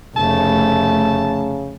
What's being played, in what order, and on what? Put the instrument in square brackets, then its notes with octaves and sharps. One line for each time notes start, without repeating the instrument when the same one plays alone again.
[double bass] F1 A3 [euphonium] C#3 [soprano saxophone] A5